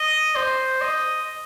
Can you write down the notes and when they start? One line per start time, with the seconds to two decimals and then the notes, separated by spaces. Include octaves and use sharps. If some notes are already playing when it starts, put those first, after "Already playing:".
Already playing: D#5
0.35 C5
0.81 D#5